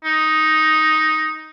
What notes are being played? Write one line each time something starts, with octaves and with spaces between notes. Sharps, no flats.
D#4